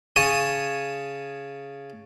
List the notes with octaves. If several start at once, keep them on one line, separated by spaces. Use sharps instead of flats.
C#3 C#5 G#5 A5 D#6